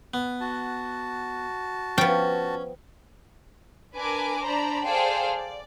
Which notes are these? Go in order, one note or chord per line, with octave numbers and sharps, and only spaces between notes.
B3
F#4 A5
F3 B3 C#4 G5
D4 A#4 B4 G#5 D6
D4 C5 D5 A#5 B5
G#4 A4 C5 D5 F5 G5
D5